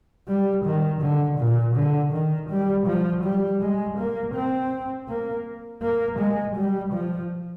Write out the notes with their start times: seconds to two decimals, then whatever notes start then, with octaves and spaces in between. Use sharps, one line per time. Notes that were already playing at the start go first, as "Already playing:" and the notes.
0.28 G3
0.65 D#3
1.02 D3
1.39 A#2
1.76 D3
2.13 D#3
2.50 G3
2.87 F3
3.24 G3
3.61 G#3
3.98 A#3
4.35 C4
5.09 A#3
5.83 A#3
6.19 G#3
6.56 G3
6.93 F3